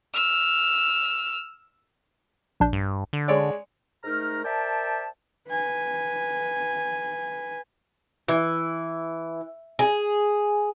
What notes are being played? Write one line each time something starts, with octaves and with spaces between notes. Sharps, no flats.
E6 F6
A#1 D4 G6
G2
D3
G#3 C#5 D5
G#2 A3 D#4 A#4 A#5 F6
A#4 C5 D5 E5 G5 A5
B4 G#5
E3
G#4